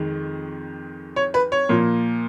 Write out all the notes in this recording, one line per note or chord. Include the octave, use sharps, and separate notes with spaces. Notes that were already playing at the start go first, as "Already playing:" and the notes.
Already playing: F2 D#3 G#3
C#5
B4
C#5
A#2 F3 A#3